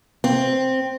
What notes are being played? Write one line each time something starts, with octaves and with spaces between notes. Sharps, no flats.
C4